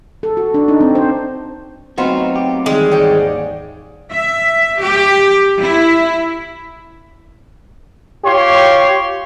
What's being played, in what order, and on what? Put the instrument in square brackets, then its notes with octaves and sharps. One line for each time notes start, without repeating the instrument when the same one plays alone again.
[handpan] A4
F#4
D4
D#4
C4
C5
[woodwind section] F#3 A3 C4 [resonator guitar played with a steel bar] B3 D#4 F4 [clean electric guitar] F#4 C5
[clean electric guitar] G4
[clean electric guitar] D#3 E3 G3 [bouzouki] G#3
[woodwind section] D#2 G#2 [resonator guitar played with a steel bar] C#5 D5 G5
[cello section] E5
G4
E4
[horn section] F4 G4 C#5 C6